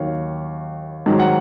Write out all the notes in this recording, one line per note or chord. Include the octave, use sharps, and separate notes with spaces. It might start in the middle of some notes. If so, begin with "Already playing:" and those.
Already playing: D#2 D#3 F#3 C#5 F5
G#2 D#3 F#3
F#5